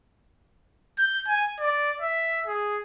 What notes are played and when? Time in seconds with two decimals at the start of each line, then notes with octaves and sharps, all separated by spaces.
0.98 G6
1.28 G#5
1.59 D5
2.01 E5
2.46 G#4